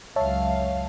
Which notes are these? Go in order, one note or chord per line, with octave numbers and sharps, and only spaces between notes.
C#2 F#2 C#5 E5 F5 A5